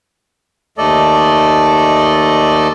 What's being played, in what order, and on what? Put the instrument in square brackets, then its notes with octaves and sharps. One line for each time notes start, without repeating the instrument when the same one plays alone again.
[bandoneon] D#2 A3 A4 D5 D#5